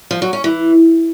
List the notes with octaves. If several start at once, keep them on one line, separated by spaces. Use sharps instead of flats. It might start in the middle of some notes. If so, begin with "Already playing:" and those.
F3
F#3
C#4
E3